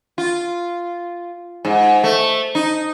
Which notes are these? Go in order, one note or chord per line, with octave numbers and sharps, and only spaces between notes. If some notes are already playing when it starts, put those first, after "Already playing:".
F4
G#2
A3
D#4